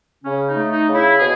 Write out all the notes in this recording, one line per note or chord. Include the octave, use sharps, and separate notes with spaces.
C#3 C#4
D#4
A3
D#4
C#3
E4
B2 G#4